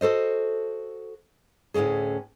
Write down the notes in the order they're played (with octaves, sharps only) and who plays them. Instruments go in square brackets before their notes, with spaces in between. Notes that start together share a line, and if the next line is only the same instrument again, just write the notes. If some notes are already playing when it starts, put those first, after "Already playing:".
[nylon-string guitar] F#4 A4 C5 D#5
D2 A2 C3 C#4 G#4